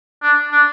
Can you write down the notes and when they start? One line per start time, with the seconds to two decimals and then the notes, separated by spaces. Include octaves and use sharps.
0.23 D4
0.52 D4